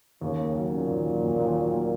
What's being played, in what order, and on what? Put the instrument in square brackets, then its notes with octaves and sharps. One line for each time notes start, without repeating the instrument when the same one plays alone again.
[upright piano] D#2 [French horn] C#3
[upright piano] A#3
F#3
[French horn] A#2 [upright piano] C#3
[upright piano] D#2
F#3
D#2
D#2
F#3
A#3